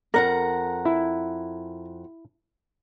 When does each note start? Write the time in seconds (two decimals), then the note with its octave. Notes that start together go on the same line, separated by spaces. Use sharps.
0.14 F2 A#4 F#5 A#5
0.85 E4